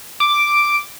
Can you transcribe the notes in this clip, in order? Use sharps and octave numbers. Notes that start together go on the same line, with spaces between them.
D6